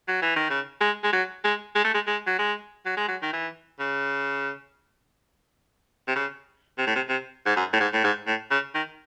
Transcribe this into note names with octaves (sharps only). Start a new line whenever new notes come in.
F#3
E3
D#3
C#3
G#3
G#3
F#3
G#3
G#3
A3
G#3
G#3
F#3
G#3
F#3
G#3
F#3
D#3
E3
C#3
C3
C#3
C3
A2
C3
C3
G#2
F#2
A2
G#2
A2
G#2
A2
C#3
D#3